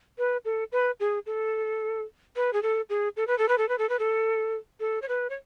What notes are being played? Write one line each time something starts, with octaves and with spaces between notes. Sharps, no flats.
B4
A4
B4
G#4
A4
B4
G#4
A4
G#4
A4
B4
A4
B4
A4
B4
A4
B4
A4
A4
C#5
B4
C#5